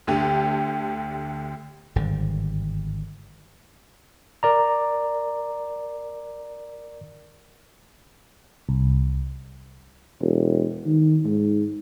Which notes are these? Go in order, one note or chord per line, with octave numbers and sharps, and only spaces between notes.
D2 D3 G4
G#1 G2 D3
A#4 D5 A#5
C2
E1
D#3
G#2